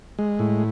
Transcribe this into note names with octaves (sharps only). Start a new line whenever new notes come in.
G#3
A2